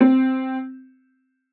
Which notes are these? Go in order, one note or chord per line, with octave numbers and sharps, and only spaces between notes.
C4